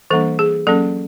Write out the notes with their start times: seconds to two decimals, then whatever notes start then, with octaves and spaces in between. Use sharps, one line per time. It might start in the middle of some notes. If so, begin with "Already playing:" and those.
0.10 E3 G3 A#3 D4 A4
0.39 G#4
0.67 F#3 A#3 C#4 A4